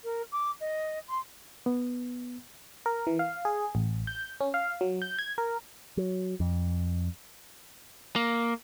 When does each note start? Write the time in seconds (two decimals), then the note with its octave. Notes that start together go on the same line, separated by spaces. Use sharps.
0.04 A#4
0.32 D6
0.60 D#5
1.08 C6
1.66 B3
2.86 A#4
3.07 E3
3.19 F5
3.45 G#4
3.75 A1
4.07 G6
4.41 C#4
4.54 F5
4.81 F#3
5.02 G6
5.19 G#6
5.38 A#4
5.97 F#3
6.40 F2
8.16 A#3